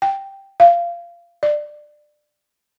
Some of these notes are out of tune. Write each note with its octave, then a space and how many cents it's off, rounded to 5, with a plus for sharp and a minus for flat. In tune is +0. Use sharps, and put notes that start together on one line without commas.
G5 +0
F5 -20
D5 +20